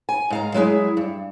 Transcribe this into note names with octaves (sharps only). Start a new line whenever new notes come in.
G#5
G#2 F5 A#5
F#3 G#3 E4 G#4
G2